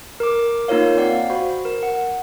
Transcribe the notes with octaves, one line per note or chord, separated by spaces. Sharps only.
A#4 D6
A#3 D#4 F4 A#4 C#5 F5
C4 D5 F5 F#5
F#4 C5 B5
A#4
F#5